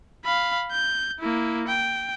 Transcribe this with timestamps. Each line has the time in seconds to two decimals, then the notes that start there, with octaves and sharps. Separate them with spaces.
0.25 F5 B5
0.71 G6
1.19 A#3 E4
1.68 G5